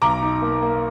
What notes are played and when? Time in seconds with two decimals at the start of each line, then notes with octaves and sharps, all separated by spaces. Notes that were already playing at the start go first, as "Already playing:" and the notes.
0.02 B1 A#5 D6
0.22 D#4
0.42 A#3
0.62 A#3